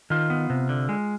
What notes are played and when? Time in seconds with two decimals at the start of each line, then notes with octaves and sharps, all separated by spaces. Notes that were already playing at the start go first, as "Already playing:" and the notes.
0.10 D#3 F4
0.30 B3
0.50 C3
0.69 D3
0.89 G#3